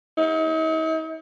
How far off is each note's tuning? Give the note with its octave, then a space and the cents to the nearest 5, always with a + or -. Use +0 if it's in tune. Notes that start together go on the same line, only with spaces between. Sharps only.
D#4 +45